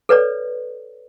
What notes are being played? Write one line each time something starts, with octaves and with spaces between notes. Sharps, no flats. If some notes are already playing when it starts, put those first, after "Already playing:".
A4 B4 C#5 D5